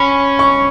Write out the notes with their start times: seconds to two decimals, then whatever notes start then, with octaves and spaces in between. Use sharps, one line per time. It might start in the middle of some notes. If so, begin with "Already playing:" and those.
Already playing: C#4 B5
0.39 C#6